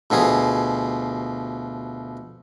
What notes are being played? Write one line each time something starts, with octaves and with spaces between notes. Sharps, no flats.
D2 B2 F3 G#4